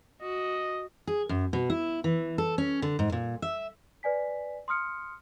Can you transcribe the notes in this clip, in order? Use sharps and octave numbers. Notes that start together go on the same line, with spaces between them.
F#4 D#5
G#4
F#2
B2
E4
E3
A4
C#4
D3
G#2
A#2
E5
B4 D5 G#5 B6
C6 D#6 F6 C#7